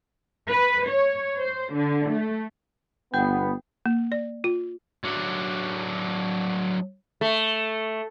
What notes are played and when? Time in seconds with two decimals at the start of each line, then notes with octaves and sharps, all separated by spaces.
0.49 B4
0.89 C#5
1.40 C5
1.74 D3
2.10 A3
3.14 G1 B3 G5 G6
3.86 A#3
4.12 D5
4.44 F4
5.04 F#3 D4
7.21 A3